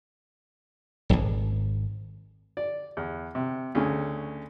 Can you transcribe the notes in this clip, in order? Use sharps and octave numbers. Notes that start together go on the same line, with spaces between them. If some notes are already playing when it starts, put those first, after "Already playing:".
D#1 G#1
D5
E2
C3
D2 C#3 C#4